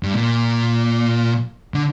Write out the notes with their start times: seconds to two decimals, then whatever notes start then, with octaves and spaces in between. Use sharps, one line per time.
0.03 G2
0.14 A#2
1.74 D3